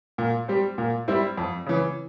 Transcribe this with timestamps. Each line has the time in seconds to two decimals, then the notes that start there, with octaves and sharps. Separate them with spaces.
0.18 A#2
0.48 G3 C4
0.78 A#2
1.08 G3 C4 E4
1.38 F2
1.66 C#3 E3